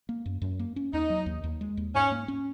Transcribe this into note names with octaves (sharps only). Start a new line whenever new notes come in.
A#3
F#2
F#2
A#3
C#4
D#2 D#4
F#3
D#2
D#2
G#3
D#2
G#2 C#4
A#3
C#4